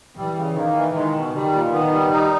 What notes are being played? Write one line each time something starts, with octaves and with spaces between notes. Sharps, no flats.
E3 G3
C#3
D#3 A#3
E3
D#3 G#3
B2
D#3 G3
A#2
D#3 B3
G3
D#4